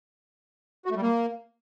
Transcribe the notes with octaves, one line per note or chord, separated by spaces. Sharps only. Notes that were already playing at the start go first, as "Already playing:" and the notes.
F#4
A3
G3
A#3